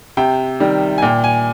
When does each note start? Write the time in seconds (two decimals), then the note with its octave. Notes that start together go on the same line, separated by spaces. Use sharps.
0.17 C3 G5
0.60 D#3 G3
0.98 G#5
1.02 A#2 G5
1.24 G#5